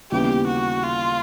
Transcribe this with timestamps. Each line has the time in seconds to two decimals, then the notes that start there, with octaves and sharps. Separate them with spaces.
0.11 D#2 C#3 E3 G3 B3 G4
0.48 F#4
0.84 F4